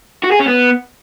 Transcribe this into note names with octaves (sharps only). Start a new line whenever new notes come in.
F#4
G#4
C#4
B3